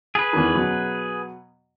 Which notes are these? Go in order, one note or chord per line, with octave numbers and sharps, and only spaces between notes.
G#4 B4
E2 D#3
B2 F#3